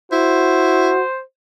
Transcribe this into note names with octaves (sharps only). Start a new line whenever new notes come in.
E4 F#4 C5